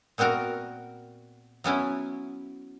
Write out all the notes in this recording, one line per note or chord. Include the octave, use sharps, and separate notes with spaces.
A#2 B3 C4 F#4 A#4
F#3 B3 C#4 E4